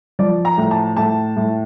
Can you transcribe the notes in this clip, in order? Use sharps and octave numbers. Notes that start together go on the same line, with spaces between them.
F3 D5
A#5
A2
A5
A2 A5
A2